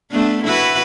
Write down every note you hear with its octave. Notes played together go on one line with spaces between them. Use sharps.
A3 B3 D4
E4 F#4 B4